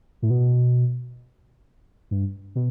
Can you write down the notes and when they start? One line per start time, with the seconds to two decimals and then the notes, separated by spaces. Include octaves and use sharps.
0.22 A2
0.30 B2
2.11 G2
2.55 B2